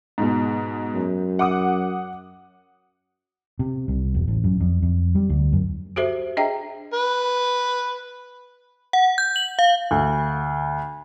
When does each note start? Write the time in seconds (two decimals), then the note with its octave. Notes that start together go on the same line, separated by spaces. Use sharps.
0.18 G#2 B2
0.94 F#2
1.39 F#5 D6 D#6
3.59 C3
3.88 C2
4.15 E1
4.28 A1
4.44 F#2
4.60 F2
4.82 F2
5.15 G3
5.29 D2
5.53 F#2
5.96 F#4 G4 A4 C5 E5
6.37 D4 G#4 D#5 E5 G5 A#5
6.94 B4
8.93 F#5
9.18 G6
9.36 F#7
9.59 F5
9.91 D2